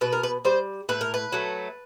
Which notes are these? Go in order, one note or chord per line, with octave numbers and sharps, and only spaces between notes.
B2 B4
A#4
B4
G3 C5
A2 B4
A#4
B4
F#3 A3